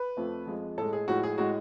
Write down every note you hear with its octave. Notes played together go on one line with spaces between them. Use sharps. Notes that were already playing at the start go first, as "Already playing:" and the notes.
Already playing: B4
F2 F3 A3
F2 F3 G#3
A2 G#3 A4
G#4
A2 F3 G#3 F#4
G#4
A2 G#3 F#4